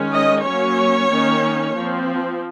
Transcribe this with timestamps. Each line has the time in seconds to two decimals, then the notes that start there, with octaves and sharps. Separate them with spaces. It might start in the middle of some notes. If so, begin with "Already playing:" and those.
Already playing: D#3 G#3 C#4
0.13 D#5
0.45 F#3 A#3 C#4 C#5
1.10 D#3 A#3 C#4
1.76 F3 C4